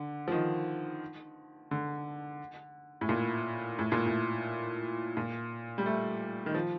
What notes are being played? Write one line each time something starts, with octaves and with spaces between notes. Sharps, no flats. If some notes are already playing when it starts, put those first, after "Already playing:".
Already playing: D3
F3
D#3
D3
A2
A#2
A2
A#2
A2
A#2
G3
A3
D#3
F3